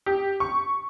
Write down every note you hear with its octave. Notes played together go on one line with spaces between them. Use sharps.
G4
C#6